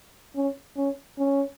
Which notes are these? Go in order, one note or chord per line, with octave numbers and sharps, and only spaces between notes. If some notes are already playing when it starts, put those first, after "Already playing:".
C#4
C#4
C#4